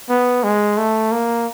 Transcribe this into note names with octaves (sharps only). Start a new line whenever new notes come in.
B3
G#3
A3
A#3